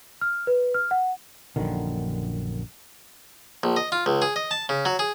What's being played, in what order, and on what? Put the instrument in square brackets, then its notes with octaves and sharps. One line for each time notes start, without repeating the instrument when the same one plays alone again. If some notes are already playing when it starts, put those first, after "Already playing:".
[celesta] F6
B4
F6
F#5
[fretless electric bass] A#1 F#2 D3 D#3
[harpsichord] A#1
D#5
F4
C#2
G#4
D#5
A5
C#3
F#3
G#4